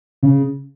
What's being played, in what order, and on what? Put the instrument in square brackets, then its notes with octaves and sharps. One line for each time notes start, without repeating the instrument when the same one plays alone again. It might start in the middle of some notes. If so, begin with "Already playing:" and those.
[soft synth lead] C#3